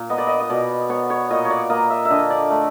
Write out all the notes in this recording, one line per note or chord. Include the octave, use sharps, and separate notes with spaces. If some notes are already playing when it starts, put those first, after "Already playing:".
Already playing: A#2
B3 D#5
D5
D#5
D#5
B2 D5
B3 C#5
C#5
A#2 D#5
C#5
D5
A#3 D#5
E5
E5
D3 D#5
D5
A3